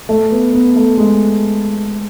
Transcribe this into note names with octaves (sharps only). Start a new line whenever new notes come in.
A3
B3
B3
A3
G#3